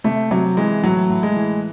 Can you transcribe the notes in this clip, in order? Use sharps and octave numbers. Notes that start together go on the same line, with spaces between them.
C3 A3
C3 F#3
E3 G#3
A2 F#3
A2
G#3
E3